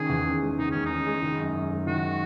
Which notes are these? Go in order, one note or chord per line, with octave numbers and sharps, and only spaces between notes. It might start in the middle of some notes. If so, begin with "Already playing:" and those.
Already playing: D#3 C#4 G#4
E2
C#4
G#3
D#3 D#4
E2 C#4
C#4 D#4
G#3
D#3
F#2
F#2
G#3
D#3 F#4